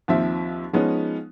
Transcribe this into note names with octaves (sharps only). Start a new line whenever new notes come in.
D#2 F3 C4 E5
F3 G#3 B3 C#4 D#4